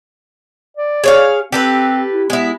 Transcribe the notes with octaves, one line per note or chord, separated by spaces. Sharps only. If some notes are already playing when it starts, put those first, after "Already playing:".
D5
G#4 C#5 F5
C4 G4 A4 B4
E4
G#3 B3 E4